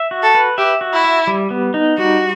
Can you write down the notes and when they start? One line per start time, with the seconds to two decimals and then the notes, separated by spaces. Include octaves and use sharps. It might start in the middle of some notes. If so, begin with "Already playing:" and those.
Already playing: E5
0.11 F#4
0.23 A4
0.35 B4
0.58 G4 E5
0.81 F#4
0.93 E4
1.04 E5
1.27 G3
1.50 B3
1.74 D#4
1.98 G3 F#4